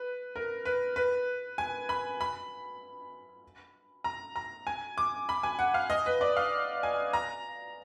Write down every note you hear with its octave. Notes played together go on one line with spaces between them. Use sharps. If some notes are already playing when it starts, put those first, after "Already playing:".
Already playing: B4
A#4
B4
B4
G#5
B5
B5
A#5
A#5
G#5
D6
B5
G#5
F#5
F5
D#5
B4
D5
F5
G#5
A#5